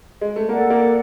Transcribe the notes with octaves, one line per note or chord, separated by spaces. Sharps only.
G#3
A3
A#3 A4 D5 F#5
A#3